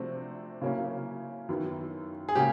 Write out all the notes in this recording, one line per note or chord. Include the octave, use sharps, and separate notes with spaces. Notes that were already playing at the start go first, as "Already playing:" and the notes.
Already playing: C3 F3 A3 D4 F#4 C5
C#3 F#3 A#3 C#4 E4
F#2 D#3 F#3 B3 E4
G#4
C#3 F#3 A#3 G4